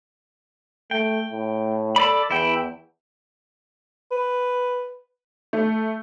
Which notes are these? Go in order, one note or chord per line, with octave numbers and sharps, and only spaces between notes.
A3 G5
A2
A4 D5 B5
E2 E4 G5
B4
A3